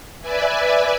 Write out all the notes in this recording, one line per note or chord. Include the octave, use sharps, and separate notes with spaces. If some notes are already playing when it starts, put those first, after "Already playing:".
B4 D5 E5 G#5